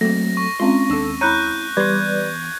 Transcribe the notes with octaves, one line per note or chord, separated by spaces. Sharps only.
F#3 A3 A#3 C4 A#6
C#6
G#3 C4 C#4 F4 C6
D#2 D4 A4 E6
E4 C#5 A#5 B5 F#6 G6 D#7
E2 G3 B4 D5 C6 G#6